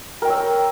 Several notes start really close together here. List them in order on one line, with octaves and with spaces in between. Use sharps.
A#4 G5 C#5 E6